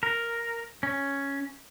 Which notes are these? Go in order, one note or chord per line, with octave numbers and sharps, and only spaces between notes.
A#4
C#4